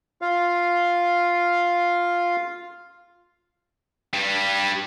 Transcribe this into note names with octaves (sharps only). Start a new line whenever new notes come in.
F4 F5
G2 G3